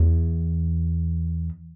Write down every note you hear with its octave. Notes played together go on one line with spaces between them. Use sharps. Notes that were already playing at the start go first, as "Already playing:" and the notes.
Already playing: E2